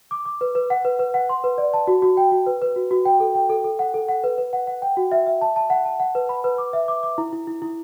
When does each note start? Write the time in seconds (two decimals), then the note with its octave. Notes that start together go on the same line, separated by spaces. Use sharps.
0.11 D6
0.25 D6
0.41 B4
0.55 B4
0.70 F#5
0.85 B4
0.99 B4
1.14 F#5
1.29 C6
1.44 B4
1.58 D5
1.73 A5
1.87 F#4
2.02 F#4
2.17 G5
2.32 F#4
2.46 B4
2.62 B4
2.76 F#4
2.91 F#4
3.05 G5
3.20 A4
3.35 G5
3.49 A4
3.64 A4
3.79 F#5
3.94 A4
4.09 F#5
4.24 B4
4.38 B4
4.53 F#5
4.67 F#5
4.82 G5
4.97 F#4
5.12 E5
5.27 E5
5.41 A5
5.56 A5
5.70 F#5
5.85 A5
6.00 F#5
6.15 B4
6.29 B5
6.44 B4
6.58 D6
6.73 E5
6.88 D6
7.03 D6
7.18 E4
7.33 E4
7.47 E4
7.62 E4